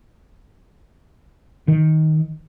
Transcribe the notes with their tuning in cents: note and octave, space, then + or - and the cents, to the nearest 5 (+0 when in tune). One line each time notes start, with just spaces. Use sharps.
D#3 +10